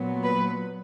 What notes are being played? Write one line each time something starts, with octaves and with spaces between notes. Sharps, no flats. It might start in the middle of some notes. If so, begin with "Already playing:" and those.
Already playing: A#2 F#3 B3
B4